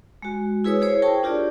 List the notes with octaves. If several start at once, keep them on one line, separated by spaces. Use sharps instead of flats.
G#3 F#4
E4 G#4 B4 C#5 D#6 E6
E4 G#4 C5 C#5
G#4 A#4 C5 G5 A5 C#6
D4 F4 G4 A#4 D5